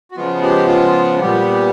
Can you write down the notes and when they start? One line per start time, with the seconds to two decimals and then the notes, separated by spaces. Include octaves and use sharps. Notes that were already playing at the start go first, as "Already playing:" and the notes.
0.11 F#4
0.16 C#3 F3 G#3 B3 F4
0.43 G4
0.68 F4
1.20 A#2 G3 B3 G4